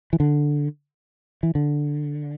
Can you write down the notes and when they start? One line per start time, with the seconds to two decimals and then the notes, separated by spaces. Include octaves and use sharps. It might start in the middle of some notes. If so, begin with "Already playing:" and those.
0.13 E3
0.20 D3
1.43 E3
1.55 D3